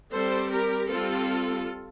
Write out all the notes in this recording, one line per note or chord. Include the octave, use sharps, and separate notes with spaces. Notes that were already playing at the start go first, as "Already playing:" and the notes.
G3 C4 A4 C5
G4 A#4
G3 C4 F4 A4